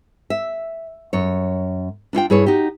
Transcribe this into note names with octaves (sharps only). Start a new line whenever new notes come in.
E5
F#2 C#5
D4 E4 F4 G5
G2 E4 G#4 B4 C#5
D#4 F#4 G4